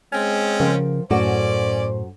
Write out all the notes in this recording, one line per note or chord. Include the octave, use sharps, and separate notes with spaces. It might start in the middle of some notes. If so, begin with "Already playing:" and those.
G#3 C4 C#4
C#3 F3 A#4 G5
F#2 A2 C#4 F#4 A4 C5 D5